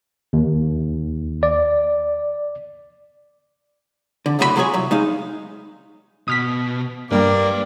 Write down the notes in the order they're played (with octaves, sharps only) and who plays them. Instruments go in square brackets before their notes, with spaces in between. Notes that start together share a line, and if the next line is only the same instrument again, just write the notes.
[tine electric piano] D#2
D5
[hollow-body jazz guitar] D3
C#2 F#2 A2 F#3 F4 B5
F#3 G#3 F4 G4 G#4 C#5
C2 F#3
G#3 D#4 F5
[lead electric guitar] B2 [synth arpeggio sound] D#6 F6 B6
[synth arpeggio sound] G2 G3 [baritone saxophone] A#3 [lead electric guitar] B4 G5 [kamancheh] D5